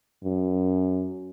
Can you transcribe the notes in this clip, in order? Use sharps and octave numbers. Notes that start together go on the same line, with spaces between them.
F#2